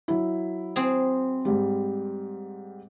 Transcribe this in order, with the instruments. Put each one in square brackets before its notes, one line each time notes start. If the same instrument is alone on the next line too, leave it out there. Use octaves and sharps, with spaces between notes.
[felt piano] F#3 E4
[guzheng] C4 G#4
[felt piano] G#2 G3